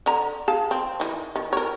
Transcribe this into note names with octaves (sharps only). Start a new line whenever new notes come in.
D3 A#5
G#4 F5 A5
C4
D#3 E3
D#3
A#4 C#5